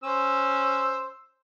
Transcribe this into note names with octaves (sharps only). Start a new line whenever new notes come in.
C#4 C5 E6